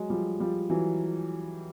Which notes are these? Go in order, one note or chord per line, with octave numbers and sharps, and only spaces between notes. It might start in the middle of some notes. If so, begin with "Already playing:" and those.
Already playing: F#3 G#3
F3 G3
F3 G3
E3 F#3